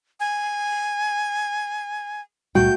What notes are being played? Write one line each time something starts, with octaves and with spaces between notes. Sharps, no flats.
G#5
C#2 A#2 G3 A3 F#4 G5 G6